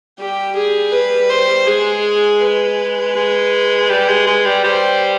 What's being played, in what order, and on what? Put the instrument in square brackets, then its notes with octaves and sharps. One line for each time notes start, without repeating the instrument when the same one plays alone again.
[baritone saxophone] G3 [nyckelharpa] G4
[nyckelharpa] G#4
B4
C5
[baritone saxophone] G#3 [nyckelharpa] G#4
[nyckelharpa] B4
[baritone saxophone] G#3
G3
G#3
G#3
G3
[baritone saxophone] G3 [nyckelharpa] C5